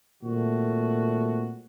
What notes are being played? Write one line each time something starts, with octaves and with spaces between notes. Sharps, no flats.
A#2 D#3 G3 A3 C4 F#4